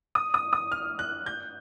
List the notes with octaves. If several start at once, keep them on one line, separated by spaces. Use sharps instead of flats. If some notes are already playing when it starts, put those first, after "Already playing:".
D#6
D#6
D#6
F6
F#6
G6